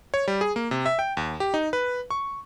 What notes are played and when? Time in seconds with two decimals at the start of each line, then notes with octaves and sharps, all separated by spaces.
0.14 C#5
0.28 G3
0.41 G#4
0.56 A#3
0.71 C3
0.86 E5
0.99 G5
1.17 D#2
1.40 G4
1.54 D#4
1.73 B4
2.10 C#6